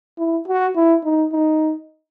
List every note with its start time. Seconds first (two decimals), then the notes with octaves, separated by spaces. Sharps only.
0.18 E4
0.47 F#4
0.75 E4
1.04 D#4
1.32 D#4